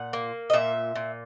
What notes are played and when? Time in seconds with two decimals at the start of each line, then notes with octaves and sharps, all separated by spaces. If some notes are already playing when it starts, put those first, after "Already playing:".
Already playing: A#2 F#5
0.13 A#3
0.50 D#5
0.53 A#2 E5
0.95 A#2